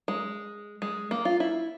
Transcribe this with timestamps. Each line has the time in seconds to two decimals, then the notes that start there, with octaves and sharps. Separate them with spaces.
0.08 G#3
0.82 G#3
1.11 A#3
1.25 F4
1.40 E4